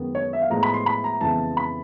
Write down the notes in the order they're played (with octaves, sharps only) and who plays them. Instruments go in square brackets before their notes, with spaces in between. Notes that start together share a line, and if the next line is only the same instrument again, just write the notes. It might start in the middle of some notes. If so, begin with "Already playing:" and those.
Already playing: [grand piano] F#2 D#3 G#3 B3
C#5
E5
F5
A2 F3 G#3 B3 A#5
B5
C6
B5
A#5
F2 C#3 E3 G#3 B3 A5
B5